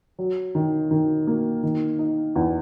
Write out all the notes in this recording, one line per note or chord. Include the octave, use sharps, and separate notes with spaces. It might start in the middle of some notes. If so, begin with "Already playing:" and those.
F#3
D#3
D#3
A#3
D#3
D#4
E2